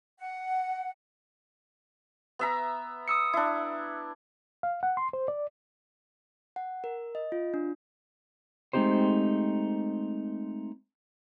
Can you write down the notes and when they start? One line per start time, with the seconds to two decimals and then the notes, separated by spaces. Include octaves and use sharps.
0.19 F#5
2.39 B3 E5 A#5
3.08 D#6 E6 C#7
3.33 D4 E4
4.63 F5
4.83 F#5
4.97 C6
5.13 C5
5.28 D5
6.56 F#5
6.84 A#4
7.15 D#5
7.32 F4
7.54 D4
8.73 G#3 A3 C4 D#4 G4 C5